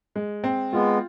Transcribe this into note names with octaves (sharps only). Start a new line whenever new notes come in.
G#3
C4
G#3 B3 F4